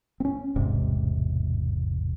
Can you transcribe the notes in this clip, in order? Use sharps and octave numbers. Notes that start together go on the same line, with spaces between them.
C4 C#4
E1 A1 G#2 C3